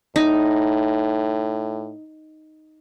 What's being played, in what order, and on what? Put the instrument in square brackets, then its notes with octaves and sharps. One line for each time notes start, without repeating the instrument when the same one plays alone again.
[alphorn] A2 [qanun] D#4